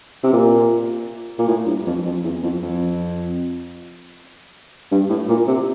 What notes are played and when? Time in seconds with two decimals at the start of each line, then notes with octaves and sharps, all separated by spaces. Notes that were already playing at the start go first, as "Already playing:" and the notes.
0.23 C3
0.33 A#2
1.39 A#2
1.48 A2
1.66 G2
1.86 F2
2.05 F2
2.24 E2
2.43 F2
2.62 F2
4.91 G2
5.09 A2
5.29 A#2
5.48 C3